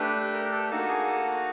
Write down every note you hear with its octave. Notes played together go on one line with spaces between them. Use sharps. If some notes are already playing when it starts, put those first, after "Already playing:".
Already playing: A3 D4 G4 B4
A#4
A4
A#3 D#4 F#4 A4
G#4
A4